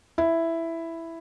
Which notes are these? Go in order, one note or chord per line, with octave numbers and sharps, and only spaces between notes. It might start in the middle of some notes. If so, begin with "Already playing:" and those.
E4